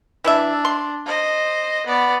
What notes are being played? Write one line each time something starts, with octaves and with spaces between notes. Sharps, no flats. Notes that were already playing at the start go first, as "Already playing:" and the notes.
E3 D4 E4 E5
C6
C5 D#5
B3 D5